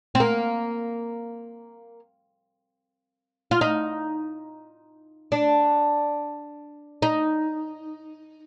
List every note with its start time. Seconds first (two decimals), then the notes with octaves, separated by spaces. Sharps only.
0.15 C4
0.20 A#3
3.51 F4
3.61 D#4
5.32 D4
7.02 D#4